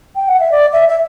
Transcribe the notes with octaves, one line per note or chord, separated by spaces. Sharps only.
G5
F#5
E5
D5
E5
E5